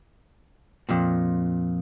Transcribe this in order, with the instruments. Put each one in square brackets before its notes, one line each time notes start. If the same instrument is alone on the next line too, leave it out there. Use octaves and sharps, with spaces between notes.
[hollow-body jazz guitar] F2 A#2